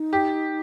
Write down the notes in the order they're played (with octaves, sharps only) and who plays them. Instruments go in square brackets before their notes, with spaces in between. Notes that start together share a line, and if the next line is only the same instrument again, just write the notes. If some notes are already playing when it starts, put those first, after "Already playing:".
Already playing: [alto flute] D#4
[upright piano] G4